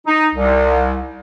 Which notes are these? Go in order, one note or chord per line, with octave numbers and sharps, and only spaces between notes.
D#4
C2